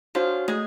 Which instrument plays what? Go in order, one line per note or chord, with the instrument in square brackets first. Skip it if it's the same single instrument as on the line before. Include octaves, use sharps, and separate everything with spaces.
[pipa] F3 F4 [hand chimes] D4 F#4 C#5
[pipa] G#3 G#4 [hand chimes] A3